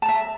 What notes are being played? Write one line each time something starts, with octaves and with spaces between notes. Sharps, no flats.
E5 A5 A#5